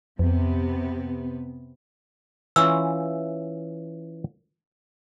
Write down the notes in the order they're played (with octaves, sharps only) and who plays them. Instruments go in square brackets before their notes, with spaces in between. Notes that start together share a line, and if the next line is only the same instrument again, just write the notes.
[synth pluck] F2 [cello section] C3 B3
[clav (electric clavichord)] E3 C#4 F4 [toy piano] E6